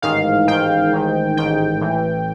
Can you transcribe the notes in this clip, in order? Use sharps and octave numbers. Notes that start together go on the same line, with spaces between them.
A1 G#2 D#3 F5
A1 G#2 D#3 G5
A1 G#2 D#3
A1 G#2 D#3 G5
A1 A2 E3